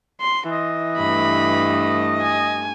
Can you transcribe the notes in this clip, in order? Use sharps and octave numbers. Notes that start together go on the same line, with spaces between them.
C6
E3 D#5
G2 A3 B5
G#5